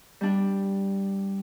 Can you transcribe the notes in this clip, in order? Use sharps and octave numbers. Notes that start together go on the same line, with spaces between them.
G3 D4